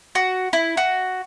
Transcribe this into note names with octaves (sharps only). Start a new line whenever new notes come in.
F#4
E4
F#4